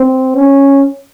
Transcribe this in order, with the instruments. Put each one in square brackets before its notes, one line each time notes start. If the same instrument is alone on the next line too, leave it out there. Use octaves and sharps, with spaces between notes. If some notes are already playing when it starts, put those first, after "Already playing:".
Already playing: [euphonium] C4
C#4